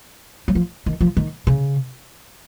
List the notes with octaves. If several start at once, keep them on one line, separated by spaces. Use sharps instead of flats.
F#3
F3
D#3
F3
D#3
C#3